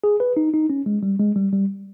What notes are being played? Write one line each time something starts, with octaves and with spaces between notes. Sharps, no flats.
G#4
B4
D#4
D#4
C#4
G#3
G3
G#3
G3
G3